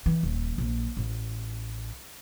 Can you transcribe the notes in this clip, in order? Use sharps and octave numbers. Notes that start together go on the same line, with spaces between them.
E3
D#1
A#1
A1